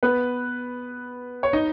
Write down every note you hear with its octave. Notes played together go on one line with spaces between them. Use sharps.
B3 B4
C#5
D#4 D#5